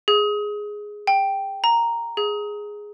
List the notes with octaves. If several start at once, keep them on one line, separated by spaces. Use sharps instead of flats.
G#4
G5
A#5
G#4